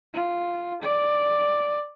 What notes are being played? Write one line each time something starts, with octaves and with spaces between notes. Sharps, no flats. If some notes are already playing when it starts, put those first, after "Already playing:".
F4
D5